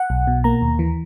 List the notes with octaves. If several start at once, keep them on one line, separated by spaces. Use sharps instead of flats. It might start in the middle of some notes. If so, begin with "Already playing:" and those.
Already playing: F#5
B1
B2
A#3 A#5
D#2
E3